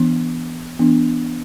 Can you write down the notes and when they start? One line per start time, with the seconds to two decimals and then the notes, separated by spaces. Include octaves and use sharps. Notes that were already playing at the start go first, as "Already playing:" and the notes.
Already playing: E3 B3 D4
0.79 E3 B3 D4